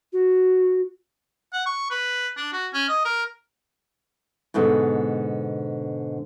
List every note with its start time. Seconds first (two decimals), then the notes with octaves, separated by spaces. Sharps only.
0.13 F#4
1.53 F#5
1.66 C#6
1.91 B4
2.37 D4
2.53 F#4
2.74 C#4
2.89 D#5
3.05 A#4
4.54 G#2 B2 D3 G#3